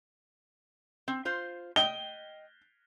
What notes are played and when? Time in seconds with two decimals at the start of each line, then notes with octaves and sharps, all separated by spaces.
1.08 C4
1.25 F4 C5
1.76 D#5 G5 G7